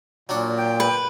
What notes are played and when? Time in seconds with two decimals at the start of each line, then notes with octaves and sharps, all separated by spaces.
0.29 A#2 F#3 D4 F#5
0.57 G5
0.80 B4